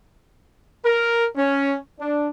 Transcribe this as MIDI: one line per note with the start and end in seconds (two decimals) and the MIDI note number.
0.85 1.25 70
1.36 1.74 61
1.99 2.28 62